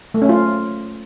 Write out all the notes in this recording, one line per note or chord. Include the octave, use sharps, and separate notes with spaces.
A3
C#4
F4